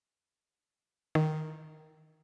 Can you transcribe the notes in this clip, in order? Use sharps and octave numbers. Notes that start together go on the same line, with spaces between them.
D#3